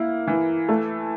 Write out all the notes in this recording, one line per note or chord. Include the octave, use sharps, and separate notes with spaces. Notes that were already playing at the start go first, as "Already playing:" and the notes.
Already playing: A#3 E4
E3
A3